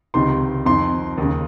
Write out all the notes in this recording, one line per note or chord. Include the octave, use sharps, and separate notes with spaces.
C#2 C3 D#3 C6
F2 D#3 C6
D#2 C#3